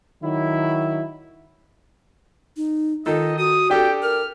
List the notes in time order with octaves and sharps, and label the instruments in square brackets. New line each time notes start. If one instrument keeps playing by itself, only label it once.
[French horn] D#3 [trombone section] F#3 E4
[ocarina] D#4
[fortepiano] D#3 D#4 A4 [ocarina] F4 [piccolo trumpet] D#5
[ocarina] F#4 [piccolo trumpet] D#6
[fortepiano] D4 G4 A4 [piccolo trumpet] G5
[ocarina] A#4 [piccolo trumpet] F6